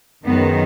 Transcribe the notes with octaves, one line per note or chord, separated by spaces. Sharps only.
F#2 D#3 G#3 B3